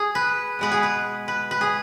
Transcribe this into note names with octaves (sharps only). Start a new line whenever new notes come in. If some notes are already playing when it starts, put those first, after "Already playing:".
Already playing: G#4
B4
B2 G#3 B3 B4
G#4
B4
B4
B4
G#4